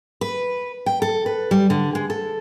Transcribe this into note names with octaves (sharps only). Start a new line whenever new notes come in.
B4
G5
A4
B4
G3
D3
G#3
A4